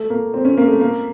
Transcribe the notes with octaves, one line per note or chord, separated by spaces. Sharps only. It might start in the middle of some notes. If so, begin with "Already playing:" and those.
Already playing: A3
A#3
C4
C#4
A#3
A3
A#3